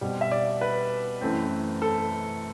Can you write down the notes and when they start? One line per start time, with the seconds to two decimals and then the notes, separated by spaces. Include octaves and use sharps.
0.01 B2 G3 C4
0.21 E5
0.31 D5
0.61 B4
1.21 F#2 E3 A3 C4
1.82 A4